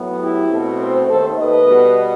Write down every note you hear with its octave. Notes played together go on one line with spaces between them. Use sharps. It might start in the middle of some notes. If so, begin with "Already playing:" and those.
Already playing: A2 F#3 B3
E4 G4
B2 A3 C4
A4 C5
D#2 D#3 A3 A4 C5
B4 D#5
B2 G3 B3